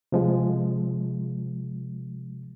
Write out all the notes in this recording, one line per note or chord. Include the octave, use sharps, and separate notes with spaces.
C3 F3 G#3